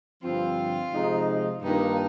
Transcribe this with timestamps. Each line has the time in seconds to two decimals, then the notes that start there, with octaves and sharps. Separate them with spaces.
0.22 G2 D3 F3 C4 F4
0.92 C3 F3 G#3 D#4
1.62 G2 D#3 A#3 D4 D#4 F4